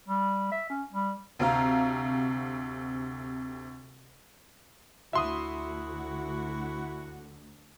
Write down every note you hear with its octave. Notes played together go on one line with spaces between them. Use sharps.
G3
E5
C#4
G3
D2 C3 C4 F5 A#5
D2 E4 F#4 E5 C6 D#6